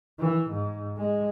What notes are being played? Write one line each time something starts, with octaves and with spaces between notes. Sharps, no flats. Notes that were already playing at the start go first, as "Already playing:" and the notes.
E3
G#2
G#3